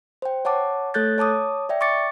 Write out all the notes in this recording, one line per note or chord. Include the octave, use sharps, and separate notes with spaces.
C5 G5
C#5 F#5 A5 D6
A3 A4 C#5 F#6 G6 A6
C#5 A5 D6 D#6
D5 E5 G5
C#6 D6 A6 C#7